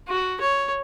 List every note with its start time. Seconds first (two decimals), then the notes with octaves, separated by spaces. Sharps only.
0.08 F#4
0.41 C#5